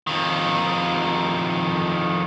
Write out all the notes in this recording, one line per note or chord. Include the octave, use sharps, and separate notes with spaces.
F2 D#3